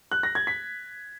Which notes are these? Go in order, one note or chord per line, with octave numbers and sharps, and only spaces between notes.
F#6
A#6
G#6
B6